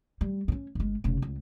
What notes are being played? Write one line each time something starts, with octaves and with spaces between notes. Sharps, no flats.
G3
G2 C#4
G1 G#3
F1 C#3
C#2